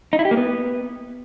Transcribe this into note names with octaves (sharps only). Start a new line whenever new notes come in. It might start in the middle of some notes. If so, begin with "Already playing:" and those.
D#4
E4
G4
A#3
B3